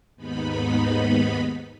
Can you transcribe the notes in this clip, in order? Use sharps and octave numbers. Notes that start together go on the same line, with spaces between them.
D#2 G#2 B3 D#4 B5